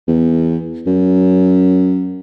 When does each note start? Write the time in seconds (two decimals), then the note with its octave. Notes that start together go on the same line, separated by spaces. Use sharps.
0.08 E2
0.87 F#2